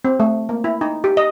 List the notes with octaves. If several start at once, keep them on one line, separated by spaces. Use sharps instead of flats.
C4
A3
A#3
E4
D#4
G4
D#5